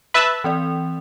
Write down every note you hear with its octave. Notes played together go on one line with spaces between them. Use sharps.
B4 E5 A5
E3 C4 D5